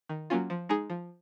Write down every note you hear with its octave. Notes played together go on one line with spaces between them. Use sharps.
D#3
F#3 A#3 C#4 F4
F3
G#3 D#4 G#4
F3